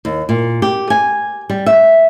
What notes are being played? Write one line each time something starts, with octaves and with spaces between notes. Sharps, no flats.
D#2
A#2
G4
G#5
G3
E5